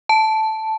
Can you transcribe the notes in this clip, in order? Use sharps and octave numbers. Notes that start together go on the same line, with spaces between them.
A5